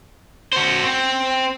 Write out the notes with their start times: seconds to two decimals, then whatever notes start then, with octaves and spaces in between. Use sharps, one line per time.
0.53 F#4 C5
0.83 C4